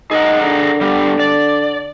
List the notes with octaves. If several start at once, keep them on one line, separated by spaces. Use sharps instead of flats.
D#4 G#4 A#4 F#5
D3
G3 B3 G4
D5